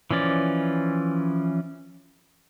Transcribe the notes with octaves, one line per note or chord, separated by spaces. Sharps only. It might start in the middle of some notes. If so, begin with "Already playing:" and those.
E3 F3 C#4 D5